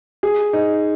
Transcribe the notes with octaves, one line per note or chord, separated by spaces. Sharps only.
G#4
D#4